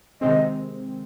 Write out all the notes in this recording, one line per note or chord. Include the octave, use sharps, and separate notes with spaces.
C3 D#3 G#3 C4 D#5